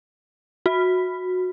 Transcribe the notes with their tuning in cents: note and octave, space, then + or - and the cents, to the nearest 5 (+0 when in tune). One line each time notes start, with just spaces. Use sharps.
F#4 -15